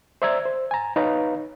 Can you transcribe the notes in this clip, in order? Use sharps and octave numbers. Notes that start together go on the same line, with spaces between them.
C5 D5 E5 A#5 E6 G#6
C5
G#5 A#5
D#4 B4 C#5 F5 A#5